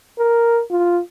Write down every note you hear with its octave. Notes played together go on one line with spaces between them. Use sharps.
A#4
F4